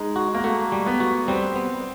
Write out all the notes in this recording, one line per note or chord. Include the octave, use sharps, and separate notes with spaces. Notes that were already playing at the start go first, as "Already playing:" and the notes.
Already playing: G#3 D#4
F#4
A#3
A3 F#4
G3
B3
F#4
G3 C4
B3